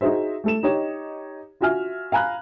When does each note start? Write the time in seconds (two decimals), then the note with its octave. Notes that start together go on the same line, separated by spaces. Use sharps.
0.01 D#4 F#4 G#4 C5 E5
0.44 A3 A4 E7
0.63 D#4 G4 C#5 D#5
1.61 F4 F#4 E5 G#5 F6
2.12 F5 G#5 A#5 B5 F#6